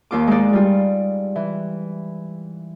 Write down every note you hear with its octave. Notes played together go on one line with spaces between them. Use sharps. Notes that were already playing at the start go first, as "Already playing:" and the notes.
D#2 F4 D6
G#3 D#4 D5
G3 F4
E3